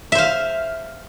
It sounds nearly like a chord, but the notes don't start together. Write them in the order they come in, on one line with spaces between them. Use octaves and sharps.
E5 C5 F5